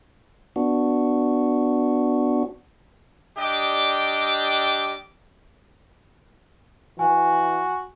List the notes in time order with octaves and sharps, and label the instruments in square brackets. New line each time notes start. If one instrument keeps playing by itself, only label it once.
[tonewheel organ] B3 D4 F#4
[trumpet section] G3 D4 G4 D#5 G5 D6
[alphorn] E3 [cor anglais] F#4 [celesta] G#5